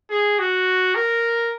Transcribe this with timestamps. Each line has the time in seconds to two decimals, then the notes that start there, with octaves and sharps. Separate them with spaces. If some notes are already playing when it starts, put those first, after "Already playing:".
0.10 G#4
0.39 F#4
0.95 A#4